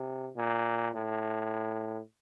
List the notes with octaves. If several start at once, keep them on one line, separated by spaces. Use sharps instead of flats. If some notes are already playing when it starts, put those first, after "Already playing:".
Already playing: C3
A#2
A2